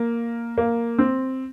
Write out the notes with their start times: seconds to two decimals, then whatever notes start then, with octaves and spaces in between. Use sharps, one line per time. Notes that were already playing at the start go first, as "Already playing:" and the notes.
Already playing: A#3
0.58 A#3
0.99 C4